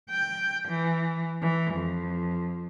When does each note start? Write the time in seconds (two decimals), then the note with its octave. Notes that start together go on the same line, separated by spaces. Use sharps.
0.10 G5
0.69 E3
1.42 E3
1.74 F2